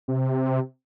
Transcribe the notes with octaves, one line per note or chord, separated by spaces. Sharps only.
C3